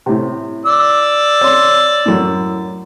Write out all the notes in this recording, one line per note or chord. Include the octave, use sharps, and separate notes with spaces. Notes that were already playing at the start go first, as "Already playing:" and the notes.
A2 C3
D5 E6
C#5 C6
F#2 A2